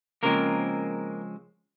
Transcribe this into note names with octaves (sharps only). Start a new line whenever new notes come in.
C#3 F3 G#3 A#3 C4 A#4